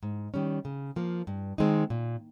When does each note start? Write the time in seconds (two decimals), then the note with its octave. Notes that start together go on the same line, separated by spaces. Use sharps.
0.03 G#2
0.34 D#3 G3 C#4
0.65 C#3
0.96 F3 A#3
1.27 G2
1.58 D#3 G#3 C4 D#4
1.90 A#2